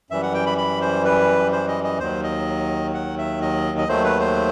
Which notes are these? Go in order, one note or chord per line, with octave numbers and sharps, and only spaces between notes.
F#2 E3 G3 E5
F#5
G5
B5
B5
C5
B4
C5
D#5
D#5
D#2 D#3 F#3 C5
D#5
F#5
E5
D#5
D#5
D#2 D#3 F#3 A3 C5
B4
C5